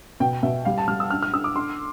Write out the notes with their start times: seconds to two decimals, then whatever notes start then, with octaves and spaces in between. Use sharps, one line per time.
0.20 B2 G5
0.43 B2 E5
0.65 G3 F5
0.78 A5
0.88 G3 F6
1.00 E6
1.10 D4 F6
1.22 F6
1.33 D4 E6
1.44 D6
1.56 D4 C6